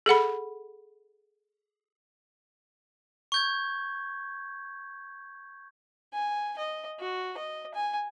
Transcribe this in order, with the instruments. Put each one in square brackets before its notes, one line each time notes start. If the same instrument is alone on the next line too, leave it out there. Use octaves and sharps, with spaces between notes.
[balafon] G#4 A4 F#5 B5
[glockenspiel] C#6 G6 G#6
[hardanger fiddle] G#5
D#5
F#4
D#5
G#5